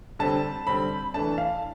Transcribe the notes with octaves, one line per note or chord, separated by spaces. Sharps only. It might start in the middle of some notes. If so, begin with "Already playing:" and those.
D3 G3 C4 A5
D3 G3 C4 B5
E3 A3 D4 A5
F5